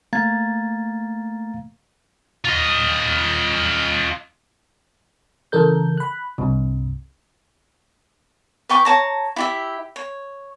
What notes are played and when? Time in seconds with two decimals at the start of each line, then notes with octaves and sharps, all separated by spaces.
0.13 A3 A#3 F5 A#5 G#6 A6
2.45 F4 D#5
5.52 C#3 E3 A4 A#4 G6
5.98 B5 F#6
6.38 C2 G2 C3
8.69 B4 G5 C#6 D6
8.85 C#5 A5 A#5
9.36 E4 G4 E5
9.96 C#5